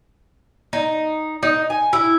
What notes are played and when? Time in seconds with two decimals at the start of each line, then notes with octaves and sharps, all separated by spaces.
0.73 D#4
1.43 D#4
1.70 G#5
1.93 E4